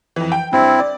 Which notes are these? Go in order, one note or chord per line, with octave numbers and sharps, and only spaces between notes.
F2 E3
G5
G2 C4 E4
D5